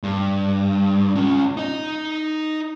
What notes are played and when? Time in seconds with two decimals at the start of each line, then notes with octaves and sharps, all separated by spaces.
0.03 G2
1.15 C#4 F4
1.57 D#4 D#5